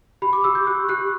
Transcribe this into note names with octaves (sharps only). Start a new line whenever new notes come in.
G4 B5
D6
G4 E6
G6
G4 F#6
G4 F#6